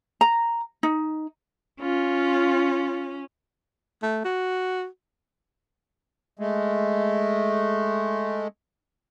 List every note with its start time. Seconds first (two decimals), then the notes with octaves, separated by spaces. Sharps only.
0.21 A#5
0.83 D#4
1.81 C#4 F4
4.03 A3
4.25 F#4
6.39 G#3 A3